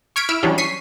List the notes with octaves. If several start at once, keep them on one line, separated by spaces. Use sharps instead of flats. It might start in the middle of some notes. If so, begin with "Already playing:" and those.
C#6 F6 G#6 B6 D7
E4 E6 F6 D7
E3 F#3 G3 C#4 D4 E4
C#6 B6 C7 D#7